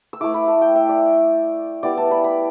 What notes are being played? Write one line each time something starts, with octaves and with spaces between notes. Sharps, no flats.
E6
A3 E4 D6
B5
A5
G5
E5
D5
G3 B3 E4 D5
A5
B5
B5